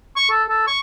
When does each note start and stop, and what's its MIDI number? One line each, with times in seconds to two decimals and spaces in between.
0.16 0.30 85
0.30 0.44 69
0.49 0.65 69
0.67 0.80 85